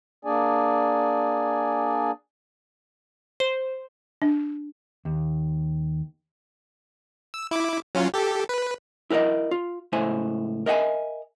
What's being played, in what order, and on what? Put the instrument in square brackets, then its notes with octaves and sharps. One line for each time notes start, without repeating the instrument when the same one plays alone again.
[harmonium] A#3 D4 G#4 D5 G#5
[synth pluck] C5
[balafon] D4
[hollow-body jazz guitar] D#2
[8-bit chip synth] E6
E4 D6
F#3 C#4 F4
G4 A4
B4
[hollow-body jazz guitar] E4 A#4 B4 D5 D#5
F4
C#2 A2 E4 C5 G#5
A#4 D#5 E5 F#5 G#5